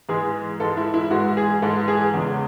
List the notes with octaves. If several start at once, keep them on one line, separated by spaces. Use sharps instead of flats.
G#2 E3 G#3 G#4
G#2 E3 G#3 A4
E4
E4
G#2 E3 G#3 F#4
G#4
G#2 E3 G#3 A4
G#4
E2 C#3 G#3